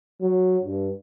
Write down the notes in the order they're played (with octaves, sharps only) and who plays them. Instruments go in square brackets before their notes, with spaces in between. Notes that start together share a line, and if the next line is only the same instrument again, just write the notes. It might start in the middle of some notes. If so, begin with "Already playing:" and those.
[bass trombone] F#3
G2